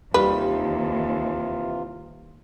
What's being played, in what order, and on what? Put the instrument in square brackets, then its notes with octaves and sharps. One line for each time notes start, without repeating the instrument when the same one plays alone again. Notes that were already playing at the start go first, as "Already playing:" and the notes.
[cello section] D#2 [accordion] C3 E3 F4 [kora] D#3 G3 G4 [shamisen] B4